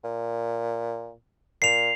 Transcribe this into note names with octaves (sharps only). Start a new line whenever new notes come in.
A#2
A#2 C7 F7